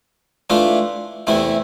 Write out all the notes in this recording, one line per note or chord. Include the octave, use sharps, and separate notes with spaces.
E3 A3 D4 F4
E2 C3 E3 A3 E4